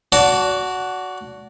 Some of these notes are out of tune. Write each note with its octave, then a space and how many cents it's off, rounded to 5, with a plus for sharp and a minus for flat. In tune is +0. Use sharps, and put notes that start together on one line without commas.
F#4 +0 D5 -35 A5 +0